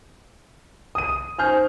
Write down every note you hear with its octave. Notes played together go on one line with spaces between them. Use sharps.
D#6 D#7
C#4 D#4 C5 G#5 F6 G6